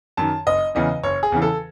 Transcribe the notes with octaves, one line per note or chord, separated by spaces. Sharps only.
F#2 D#3 A5
F#1 D#5
E2 C#3 E3 D#5
F#1 C#5
G#4
E2 C#3 E3
A4